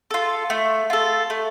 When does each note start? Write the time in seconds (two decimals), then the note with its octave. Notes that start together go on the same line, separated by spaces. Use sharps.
0.11 F4 A4
0.50 A3
0.90 F4 A4
1.30 A3